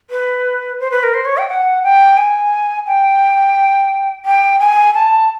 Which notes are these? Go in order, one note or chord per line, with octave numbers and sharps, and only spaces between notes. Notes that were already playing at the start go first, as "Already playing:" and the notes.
B4
C5
B4
A#4
C5
C#5
G5
F#5
G5
G#5
G5
G5
G#5
A5